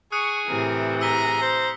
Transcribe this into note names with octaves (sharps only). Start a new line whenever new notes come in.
G#4 C#6 D#6 F#6 C#7
A2 C3 E3 A#4
G#4 A#5 E6 B6 G7
C5